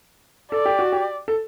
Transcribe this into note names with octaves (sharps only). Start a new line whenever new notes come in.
A4 D5
G4
F#4
G4
A4